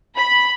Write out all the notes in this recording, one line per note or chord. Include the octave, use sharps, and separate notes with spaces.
B5